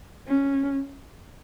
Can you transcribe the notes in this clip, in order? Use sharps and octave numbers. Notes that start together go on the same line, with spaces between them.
C#4